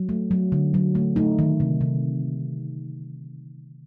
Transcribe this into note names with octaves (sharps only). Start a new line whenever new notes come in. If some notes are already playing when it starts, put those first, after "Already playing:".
Already playing: F#3
A3
F#3
D3
F#3
A3
A3 D#4
D#3
C3
C3